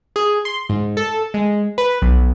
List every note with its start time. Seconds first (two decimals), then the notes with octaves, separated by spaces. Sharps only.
0.16 G#4
0.45 C6
0.69 G#2
0.97 A4
1.34 G#3
1.78 B4
2.02 B1